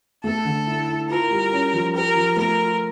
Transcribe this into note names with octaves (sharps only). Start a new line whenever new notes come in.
A3 A4
D3
E4
E4
F4 A#4
G3
C#4
F3
G4 A#4
F3
A3 A#4
F4